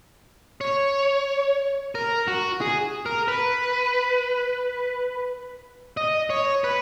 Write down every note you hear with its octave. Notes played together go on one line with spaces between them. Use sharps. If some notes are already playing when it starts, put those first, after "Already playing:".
C#5
A#4
F#4
G#4
A#4
B4
D#5
C#5
B4